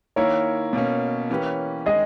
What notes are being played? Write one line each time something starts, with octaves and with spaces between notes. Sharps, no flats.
D#3 A#3 E4 A#4 C#5
B2 A#3 C#4
E3 A#3 C#4 G4 B4
D#3 G#3 D#4 G#4 D#5